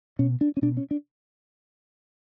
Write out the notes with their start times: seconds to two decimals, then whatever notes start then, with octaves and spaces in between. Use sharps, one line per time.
0.19 B2 C#4
0.41 D4
0.57 C#4
0.62 B2 D4
0.77 C#4
0.91 D4